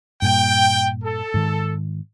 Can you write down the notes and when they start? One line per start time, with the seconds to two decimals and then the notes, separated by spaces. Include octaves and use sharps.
0.22 G2 A#2 G5
1.03 A4
1.34 G#2 D#3